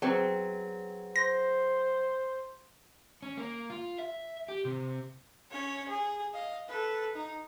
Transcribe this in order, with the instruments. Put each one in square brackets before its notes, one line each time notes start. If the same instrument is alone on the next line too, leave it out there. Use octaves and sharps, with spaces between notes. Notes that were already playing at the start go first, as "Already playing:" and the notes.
[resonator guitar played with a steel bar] F#3 C4 [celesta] G#4 B4 A#5
[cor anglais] C5 [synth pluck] A#6
[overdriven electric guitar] C#4
A#3
F4
E5
G4
C3
[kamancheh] C#4 C#5
G#4
D#5 F5
A4 B4
D#4